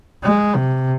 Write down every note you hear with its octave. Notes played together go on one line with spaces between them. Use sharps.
G#3
C3